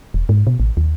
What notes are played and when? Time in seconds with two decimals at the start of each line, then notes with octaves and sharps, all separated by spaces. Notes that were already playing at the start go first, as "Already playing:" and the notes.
0.14 E1
0.29 G#2
0.47 B2
0.60 A1
0.77 D#2